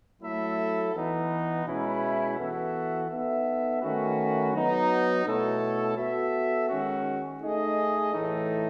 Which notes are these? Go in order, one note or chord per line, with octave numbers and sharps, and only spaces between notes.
F#3 A3 E4 A4 E5
E3 B3 D#4
B2 G#3 C#4 E4 B4
E3 B3 F#4 A4 E5
B3 D#4 A4 E5
D#3 A3 C#4 F#4 B4
F#3 B3 D#4
B2 A3 E4 A4 C#5
B3 F#4 A4 E5
D#3 G#3 C#4 F#4
A3 D#4 G#4 D#5
A2 E3 A3 D#4